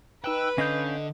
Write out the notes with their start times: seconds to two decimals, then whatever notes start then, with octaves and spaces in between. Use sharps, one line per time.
0.24 D#4 B4 G5 E6 F#6
0.58 D3 C#4 D#5 F5 G6